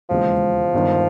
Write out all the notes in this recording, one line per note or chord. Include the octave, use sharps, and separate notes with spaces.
E1 D#2 C#3 E3 F3 G#3
G1 G2 D#3